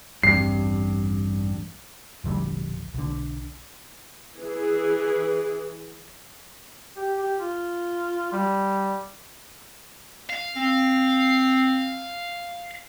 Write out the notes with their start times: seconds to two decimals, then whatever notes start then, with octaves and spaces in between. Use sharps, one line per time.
0.23 A1 E2 G2 C4 C7
2.24 E1 A#1 D3 G3
2.94 B1 D3
4.37 E3 G#4
6.97 G4
7.18 G4
7.39 F4
8.33 G3
10.29 F5
10.56 C4